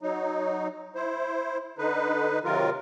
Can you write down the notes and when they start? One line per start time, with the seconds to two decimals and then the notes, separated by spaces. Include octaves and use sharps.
0.02 F#3 D#4
0.95 E4 C5
1.78 D3 D#4 B4
2.45 C3 D#3 F#3 F4 A#4